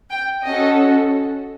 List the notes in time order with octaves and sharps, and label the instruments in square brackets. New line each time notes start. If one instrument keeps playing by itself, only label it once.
[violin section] G5
C#4 F#4 A4 D#5